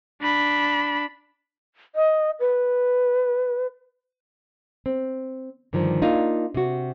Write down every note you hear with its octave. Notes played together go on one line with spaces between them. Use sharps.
D4 B5
D#5
B4
C4
G2 D3 D#3 F3
A#3 D4 D#4 F4
C3 F#4